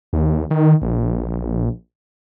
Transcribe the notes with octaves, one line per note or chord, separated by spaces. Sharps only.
D#2
D#3
A#1